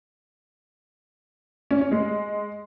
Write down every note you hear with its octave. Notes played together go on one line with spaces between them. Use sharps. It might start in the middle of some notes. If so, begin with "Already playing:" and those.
C#4
C#4
G#3